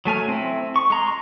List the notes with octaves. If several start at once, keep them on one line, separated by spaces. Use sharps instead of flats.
F#3 A3 G#5 F6
C4 E4
C#6
G#3 A#5 C6